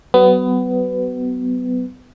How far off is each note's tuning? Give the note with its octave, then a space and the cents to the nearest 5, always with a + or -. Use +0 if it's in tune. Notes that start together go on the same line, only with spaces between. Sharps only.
F#3 +35 B3 +20